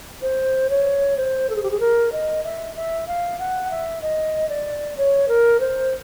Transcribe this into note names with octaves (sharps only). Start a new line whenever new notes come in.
C5
C#5
C5
A4
G#4
G4
G#4
A#4
D#5
E5
E5
F5
F#5
E5
D#5
D5
C#5
A#4
C5